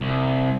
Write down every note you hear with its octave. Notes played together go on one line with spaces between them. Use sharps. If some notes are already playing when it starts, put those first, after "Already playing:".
C2